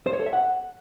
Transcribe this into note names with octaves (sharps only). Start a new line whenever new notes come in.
C5
C#5
A4
E5
F#5